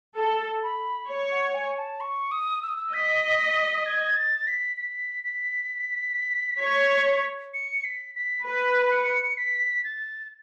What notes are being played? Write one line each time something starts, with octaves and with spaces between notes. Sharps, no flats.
A4 A5
B5
C#5
F#5
G#5
A5
C#6
D#6
E6
D#6
E6
D#5 B6
G#6
A6
B6
B6
B6
C#5
C#7
B6
B6
B4 B6
C#7
B6
A6